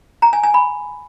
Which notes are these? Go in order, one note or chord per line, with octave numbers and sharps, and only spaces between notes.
A#5
G#5
G#5
B5